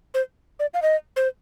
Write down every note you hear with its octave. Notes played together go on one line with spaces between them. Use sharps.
C5
D5
F5
D#5
C5